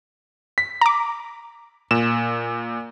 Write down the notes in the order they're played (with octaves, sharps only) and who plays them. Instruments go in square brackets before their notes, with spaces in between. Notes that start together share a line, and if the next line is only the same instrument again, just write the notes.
[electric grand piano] B6
[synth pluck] A#5 D6
[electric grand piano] A#2 E7